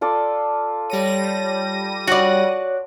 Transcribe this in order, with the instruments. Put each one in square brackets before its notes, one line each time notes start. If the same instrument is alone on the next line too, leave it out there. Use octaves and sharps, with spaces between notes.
[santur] F4 A4 D5
[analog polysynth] G3 A#6 D#7 [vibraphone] C#5
[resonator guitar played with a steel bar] F#4 D5 [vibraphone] C#5